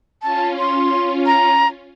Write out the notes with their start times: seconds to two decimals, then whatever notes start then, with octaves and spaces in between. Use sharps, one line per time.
0.22 C#4 F4 A5
0.59 C6
1.26 A#5